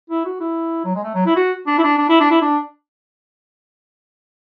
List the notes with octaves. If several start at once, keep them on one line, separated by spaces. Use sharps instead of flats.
E4
F#4
E4
F#3
G#3
A3
F#3
E4
F#4
D4
E4
D4
D4
E4
D4
E4
D4